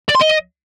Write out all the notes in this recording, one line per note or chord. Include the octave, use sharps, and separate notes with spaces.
D5
C6
D#5